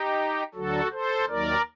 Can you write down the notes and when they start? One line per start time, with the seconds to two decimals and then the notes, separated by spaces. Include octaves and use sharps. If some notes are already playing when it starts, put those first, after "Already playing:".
Already playing: D#4 G4
0.54 D2 D3 F#3 F#4 A4
0.92 A4 C5
1.28 D#2 D#3 F#3 A#4 D5